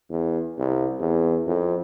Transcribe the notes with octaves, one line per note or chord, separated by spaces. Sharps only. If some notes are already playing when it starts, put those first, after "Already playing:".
E2
C2
E2
F2